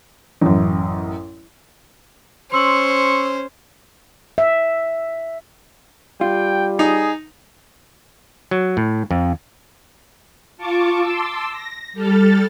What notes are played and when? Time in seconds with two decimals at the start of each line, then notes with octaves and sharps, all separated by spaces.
0.41 A1 F#2
2.52 C#4 C5 C6 C#6 E6 F#7
4.38 E5
6.21 G3 F4 G5
6.79 D#4 G#4
8.51 F#3
8.77 A2
9.11 F2
10.57 F4 A5 C#6 D6
11.00 A5 C6 D6 E6
11.50 A#6
11.93 G3 A4 F6 A6